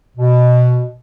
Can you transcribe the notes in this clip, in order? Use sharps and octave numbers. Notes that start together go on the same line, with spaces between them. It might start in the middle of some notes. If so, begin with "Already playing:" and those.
B2